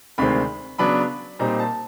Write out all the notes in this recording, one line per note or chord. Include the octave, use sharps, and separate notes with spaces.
D2 C3 D#3 G#3 C4 B5
C#3 F#3 B3 D4 B5
A#2 G3 C4 D#4 A#5
A5